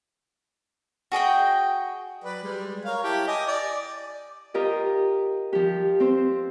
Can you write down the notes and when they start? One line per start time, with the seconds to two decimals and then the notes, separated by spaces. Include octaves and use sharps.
1.12 F#4 G#4 D#5 G5
2.24 F#3 B4 D5
2.44 G3 G#3
2.85 A#4 C#5 F5
3.03 E4 G4 A5
3.27 D#5 G#5 D6
3.47 D5 D6
4.54 F4 G4 A#4 D#5
5.53 F3 G4
6.00 C4 C5